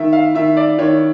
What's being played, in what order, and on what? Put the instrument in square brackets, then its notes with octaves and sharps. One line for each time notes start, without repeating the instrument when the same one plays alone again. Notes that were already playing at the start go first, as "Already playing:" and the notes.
Already playing: [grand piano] D#3 E5
F5
D#3 E5
D5
D#3 C#5